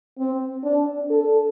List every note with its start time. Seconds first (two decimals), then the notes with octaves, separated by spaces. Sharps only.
0.18 C4
0.64 D4
1.10 A4